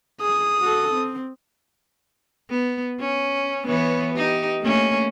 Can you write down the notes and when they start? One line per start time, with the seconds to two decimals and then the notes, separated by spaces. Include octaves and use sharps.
0.21 G#4 D#6
0.61 F#4 A4
0.94 C4
2.50 B3
3.00 C#4
3.66 E3 B3 C#5
4.14 D#4 G4
4.60 A3 A#3 C#4